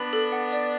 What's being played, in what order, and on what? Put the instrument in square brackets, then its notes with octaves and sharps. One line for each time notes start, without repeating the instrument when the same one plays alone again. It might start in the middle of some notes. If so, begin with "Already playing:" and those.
Already playing: [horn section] B3 D4 [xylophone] B5
[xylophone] A4
F#5
D5